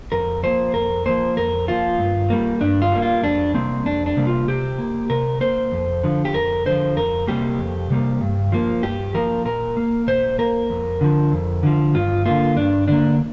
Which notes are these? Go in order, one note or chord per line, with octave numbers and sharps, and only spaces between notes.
F2 A#4
F3 A#3 C5
F2 A#4
F3 A#3 C5
F2 A#4
F3 A#3 F4
G2
G3 A#3
G2 D4
F4
G3 A#3
F4
F2 D4
C3 G3 A#3 C4
F2 D4
D4
C3 G3 A#3
F4
C3 G4
A#3
C3 A#4
A#3 C5
F2
D3 F3
G4
F2 A#4
D3 F3 C5
F2 A#4
C3 G3 A#3 G4
F2
C3 G3 A#3
G2
F3 A#3
G2 G4
F3 A#3 A#4
A#2 A#4
A#3
A#2 C5
A#3 A#4
F2
D3 F3
F2
D3 F3
G2 F4
D3 A#3 F4
G2 D4
D3 A#3 D4